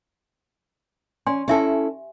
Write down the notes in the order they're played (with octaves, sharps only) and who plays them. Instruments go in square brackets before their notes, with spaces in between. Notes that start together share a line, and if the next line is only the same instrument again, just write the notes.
[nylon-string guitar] C#4 [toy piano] D5 G#5 C6
[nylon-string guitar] C#4 E4 A4 [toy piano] G4 E5 G#5